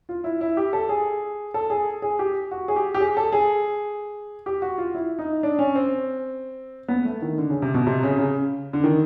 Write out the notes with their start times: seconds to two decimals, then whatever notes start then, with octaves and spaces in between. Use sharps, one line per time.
0.09 F4
0.24 E4
0.41 E4
0.57 G4
0.73 A4
0.89 G#4
1.54 A4
1.70 G#4
2.02 G#4
2.19 G4
2.51 F#4
2.68 G#4
2.76 G4
2.94 G4
3.00 G#4
3.17 A4
3.32 G#4
4.46 G4
4.62 F#4
4.78 F4
4.95 E4
5.19 D#4
5.43 D4
5.59 C#4
5.76 C4
6.88 B3
7.05 A3
7.22 D#3
7.38 D3
7.50 C#3
7.62 C3
7.74 B2
7.87 C3
8.03 C#3
8.18 C#3
8.73 D3
8.84 D#3